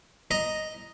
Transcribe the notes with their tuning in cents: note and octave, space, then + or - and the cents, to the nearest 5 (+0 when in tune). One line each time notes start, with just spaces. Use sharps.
D#5 +0 A#5 +0